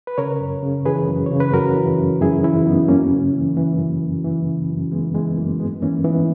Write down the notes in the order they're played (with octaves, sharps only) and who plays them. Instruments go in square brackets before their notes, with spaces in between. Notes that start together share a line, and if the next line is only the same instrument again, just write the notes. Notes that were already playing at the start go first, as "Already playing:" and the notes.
[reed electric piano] B4
C#3 A#4 C#5
F#2
C#3
E3 G#4 B4
F#2
C#3 C#5
B4
F#2 F#4 A#4
E3
F#2
F#2 E4 G#4
E3 C#4 E4
F#2 B3 D#4
F#2 A#3 C#4
C#3
E3
E3
F#2
F#2
E3
C#3
F#2
E3 G#3 B3
E3 G#3
F#2 A#3
G#2 G#3 B3
E3 A#3 C#4
E3 B3 D#4